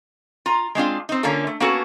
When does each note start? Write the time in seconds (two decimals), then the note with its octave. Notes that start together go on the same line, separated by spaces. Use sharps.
0.46 F4 A#5
0.75 G#3 C4 D4 F4
1.09 C4 D#4
1.23 D3 A#3 C#4 F4 A4
1.47 A3
1.60 A#3 B3 C#4 F#4 A4